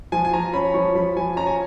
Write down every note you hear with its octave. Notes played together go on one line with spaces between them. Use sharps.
F3 G#5
G#5
F3 A#5
C#4 B5
F3 C#6
F3 B5
F3 G#5
C#4 A#5
G#5